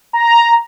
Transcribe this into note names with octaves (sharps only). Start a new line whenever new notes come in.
A#5